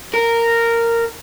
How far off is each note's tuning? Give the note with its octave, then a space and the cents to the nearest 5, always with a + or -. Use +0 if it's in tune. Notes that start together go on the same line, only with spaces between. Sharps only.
A#4 -10